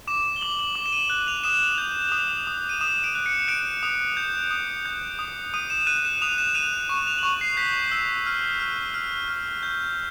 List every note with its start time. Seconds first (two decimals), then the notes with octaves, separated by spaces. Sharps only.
0.07 D6 E7
0.36 G7
0.41 D6 F#7
0.59 F#7
0.75 D6
0.86 E7
0.92 D#7
1.10 F#6
1.28 F7
1.44 D#6 E7
1.78 G6
2.12 D#6
2.47 D#6
2.69 D#7
2.81 D#6 E7
3.04 D7
3.15 F#6
3.26 C#7
3.48 F#6 D7
3.83 D#6
4.17 G6
4.51 D#6
4.86 G6
5.19 D#6
5.54 D#6 D#7
5.70 E7
5.87 F#6 D#7
5.97 D#7
6.05 E7
6.22 D#6 F7
6.38 E7
6.55 F#6 D#7
6.89 C#6 D#7
7.07 F7
7.18 F#7
7.23 C#6 F7
7.41 C7
7.57 G6 B6
7.91 E6
8.26 F6
8.60 F6
8.94 F6
9.28 F6
9.63 G6